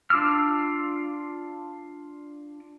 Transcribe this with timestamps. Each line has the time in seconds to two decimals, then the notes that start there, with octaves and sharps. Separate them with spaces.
0.10 D4 F4 D6 E6 F6